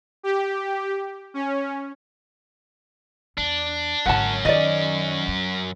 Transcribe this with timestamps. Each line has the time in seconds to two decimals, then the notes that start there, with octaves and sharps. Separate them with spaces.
0.23 G4
1.34 C#4
3.38 E2 D4
4.06 G#1 F#2 D3 C#4 F#5 A5
4.45 D#3 D5 D#5
5.28 F#3